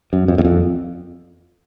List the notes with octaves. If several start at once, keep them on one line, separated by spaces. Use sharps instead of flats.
F#2
F2
E2
F2